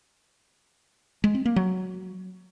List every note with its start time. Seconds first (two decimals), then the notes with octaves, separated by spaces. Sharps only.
1.24 G#3
1.35 C4
1.45 A#3
1.56 F#3